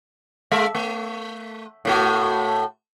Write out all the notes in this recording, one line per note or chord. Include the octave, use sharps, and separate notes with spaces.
G#3 E5
A3
A2 A3 F#4